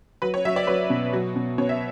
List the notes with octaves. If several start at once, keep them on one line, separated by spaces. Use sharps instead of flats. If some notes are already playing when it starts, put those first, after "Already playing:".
F#3 B4
C#5
F#3 E5
D5
F#3 B4
B2
F#3
B2
B2 C#5
E5